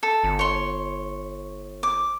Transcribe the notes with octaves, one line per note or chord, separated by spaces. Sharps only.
A4
G1
C#5 C6
D6